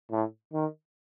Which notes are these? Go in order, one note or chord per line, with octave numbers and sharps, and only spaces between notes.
A2
D#3